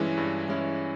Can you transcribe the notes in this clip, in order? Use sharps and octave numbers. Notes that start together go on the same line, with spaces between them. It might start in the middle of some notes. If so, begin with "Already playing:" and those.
Already playing: G2 E3 G#3 C#4 E4
G2
E3 G#3 C#4 E4